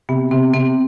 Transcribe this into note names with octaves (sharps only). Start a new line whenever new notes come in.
C3 B3
C3 C4
C3 C4